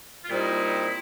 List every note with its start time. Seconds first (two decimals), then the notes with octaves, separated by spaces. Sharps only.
0.24 F4
0.29 A#2 G3 C4 D#4 E4